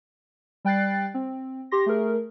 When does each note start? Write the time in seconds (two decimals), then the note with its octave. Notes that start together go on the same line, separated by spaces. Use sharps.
0.65 G3 G5 F#6 A6 C7
1.14 C4
1.71 G4 C6 A#6
1.86 A3 G#4 A#4